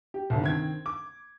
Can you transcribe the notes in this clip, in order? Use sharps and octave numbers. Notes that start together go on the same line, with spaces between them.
G4
G1 C2
D#3 C4 G#6
D6